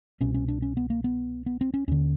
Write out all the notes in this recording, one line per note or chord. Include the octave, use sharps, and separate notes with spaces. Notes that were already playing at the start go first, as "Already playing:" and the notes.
C2 B2 C#4
C#4
D4
C#4
B3
A#3
B3
B3
C4
C#4
D#2 D3 C#4